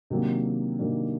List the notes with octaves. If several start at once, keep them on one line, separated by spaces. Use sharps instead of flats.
C3 D#3 F#3 A#3 D4
C3 D#3 F#3 A#3 D4